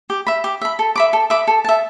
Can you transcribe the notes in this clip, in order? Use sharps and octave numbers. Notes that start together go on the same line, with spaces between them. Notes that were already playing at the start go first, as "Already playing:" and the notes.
G4
E5 B5
G4
E5 B5
A4
E5 B5 D6
A4
E5 B5 D6
A4
E5 A5